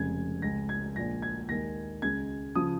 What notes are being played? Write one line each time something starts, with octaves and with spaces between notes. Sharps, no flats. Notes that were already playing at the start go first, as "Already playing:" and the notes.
Already playing: F1 F2 C#3 G#3 G#6
C#2 C#3 G#3 A#6
G#6
A#1 A#2 F3 G#3 A#6
G#6
D#2 D#3 G#3 A#6
C#2 C#3 G#3 G#6
C#3 F3 D#6